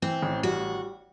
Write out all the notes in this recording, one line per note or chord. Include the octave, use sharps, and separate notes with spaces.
E3 C4
A1
G3 F#4